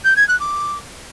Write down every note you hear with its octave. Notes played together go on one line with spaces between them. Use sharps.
G6
G#6
F#6
D6